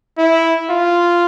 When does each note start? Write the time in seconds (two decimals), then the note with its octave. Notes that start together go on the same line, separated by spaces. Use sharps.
0.18 E4
0.70 F4